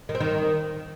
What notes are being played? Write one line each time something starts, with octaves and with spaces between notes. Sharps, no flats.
D#3
C4
D#3